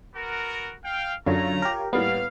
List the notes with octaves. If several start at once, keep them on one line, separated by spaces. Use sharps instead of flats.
B3 F#4 A#4
F5 G5
F#2 D3 A3 F4 C#5 A#5
G4 A#4
A2 G3 A#3 B3 F5